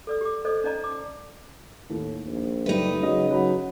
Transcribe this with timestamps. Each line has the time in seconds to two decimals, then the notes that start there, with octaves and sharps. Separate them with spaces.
0.07 A4 D5 E6
0.21 G4 D6
0.45 A4 C5 D5 D#5
0.64 C#4 D#4 D5 D#5 A5 A#5
0.84 D6
1.90 D#2 A2
2.26 A#1
2.66 F#1 G3 A3 D#4 B4
3.01 C#3 F#3 G#3 D#5
3.30 F#3 F#5 B5